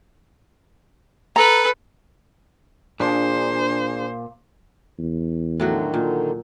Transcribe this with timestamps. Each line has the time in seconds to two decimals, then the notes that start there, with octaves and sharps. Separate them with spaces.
1.36 A4 B4 A#5
3.00 A#2 D4 G#4 C5
4.99 E2
5.60 A2 D3 D#3 F#3 F#4
5.94 A#2